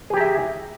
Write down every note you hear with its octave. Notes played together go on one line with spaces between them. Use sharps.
G4 G#4 E5 G#5 A#5